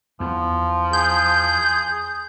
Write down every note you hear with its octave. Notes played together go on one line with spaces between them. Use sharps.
E2 F3
G#4 G6